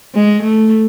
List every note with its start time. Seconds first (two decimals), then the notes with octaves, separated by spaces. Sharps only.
0.15 G#3
0.42 A3